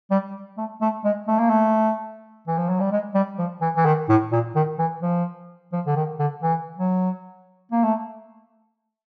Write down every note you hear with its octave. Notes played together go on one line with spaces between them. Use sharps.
G3
A3
A3
G#3
A3
A#3
A3
E3
F3
F#3
G3
G#3
G3
F3
E3
E3
D#3
A2
A#2
D#3
E3
F3
F3
D3
D#3
D3
E3
F#3
A#3
A3